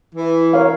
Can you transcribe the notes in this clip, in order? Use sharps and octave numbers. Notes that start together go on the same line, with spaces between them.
E3
A#4 C#5 F5